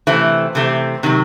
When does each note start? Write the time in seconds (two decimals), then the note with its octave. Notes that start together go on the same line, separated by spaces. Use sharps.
0.07 C3 E3 A3 C4
0.55 C3 E3 A3 C4
1.03 C3 D#3 F#3